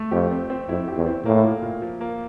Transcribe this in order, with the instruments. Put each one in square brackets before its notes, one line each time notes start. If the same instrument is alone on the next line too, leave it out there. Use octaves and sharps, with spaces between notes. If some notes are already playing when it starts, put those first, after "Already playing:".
Already playing: [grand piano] A3
[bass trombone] F2 [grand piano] G4
[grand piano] C4
C4
[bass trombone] F2 [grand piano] E4
[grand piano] G4
[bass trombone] E2
[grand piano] C4
[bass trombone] A2 [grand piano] A#3
[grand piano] A#2
A#2
F3
A#3